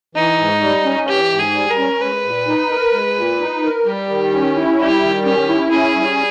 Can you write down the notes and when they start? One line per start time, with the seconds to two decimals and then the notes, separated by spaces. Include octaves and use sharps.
0.15 E3 D#4
0.38 G#2
0.61 G3
0.85 C#4
1.08 E3 G4
1.31 G#2
1.39 G#4
1.54 G3
1.70 A#4
1.77 C#4
2.01 G#3 B4
2.24 A#2
2.47 D#4
2.70 A#4
2.93 G#3
3.16 A#2
3.40 D#4
3.63 A#4
3.86 G3 G4
4.09 D#3
4.33 C#4
4.56 E4
4.78 G3 G4
5.02 D#3
5.25 C#4 G4
5.48 E4
5.71 C#4 G#4
5.95 G3